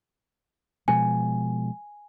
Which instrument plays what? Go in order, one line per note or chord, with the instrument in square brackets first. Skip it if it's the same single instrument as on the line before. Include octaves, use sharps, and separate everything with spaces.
[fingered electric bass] B2 F3 G#3 [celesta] G#5